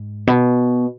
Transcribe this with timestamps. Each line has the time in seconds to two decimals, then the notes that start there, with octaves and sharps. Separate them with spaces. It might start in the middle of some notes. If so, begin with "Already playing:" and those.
Already playing: G#2
0.27 B2